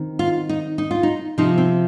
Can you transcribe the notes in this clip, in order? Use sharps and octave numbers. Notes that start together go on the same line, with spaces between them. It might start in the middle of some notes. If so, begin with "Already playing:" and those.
Already playing: D#3 C4
F4
D#4
D#4
F4
D#4
C3 F3 C4 D#4
C4